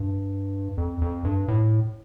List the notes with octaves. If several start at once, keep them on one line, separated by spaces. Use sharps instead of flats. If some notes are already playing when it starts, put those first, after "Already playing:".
Already playing: G2
F2
F2
G2
A2